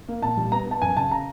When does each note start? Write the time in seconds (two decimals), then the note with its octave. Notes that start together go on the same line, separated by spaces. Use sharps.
0.08 A#3
0.22 A#2 A5
0.37 G3
0.52 B3 A#5
0.66 B3
0.71 A5
0.82 F#2 G#5
0.97 C#3 A5
1.11 A#5